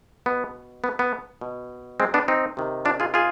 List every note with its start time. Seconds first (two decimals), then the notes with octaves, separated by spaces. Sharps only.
0.26 B2 B3
0.84 B3
0.99 B3
1.41 B2
2.00 G#3 C4
2.14 B3 D4
2.28 C4 D#4
2.57 C3 D#3
2.85 D4 F4
3.00 F4 G#4
3.14 F4 G#4